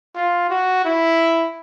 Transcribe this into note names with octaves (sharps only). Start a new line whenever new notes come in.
F4
F#4
E4